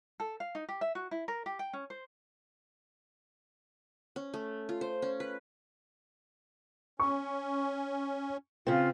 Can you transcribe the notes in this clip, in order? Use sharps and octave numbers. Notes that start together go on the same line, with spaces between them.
A4
F5
D#4
G4
E5
F#4
E4
A#4
G4
G5
C#4
C5
C#4
A3
F4
C5
C#4
B4
C#4 C#6
C#3 C4 F4